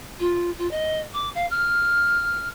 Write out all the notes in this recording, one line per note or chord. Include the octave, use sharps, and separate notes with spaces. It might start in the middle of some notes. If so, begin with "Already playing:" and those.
F4
F4
D#5
D6
F5
F6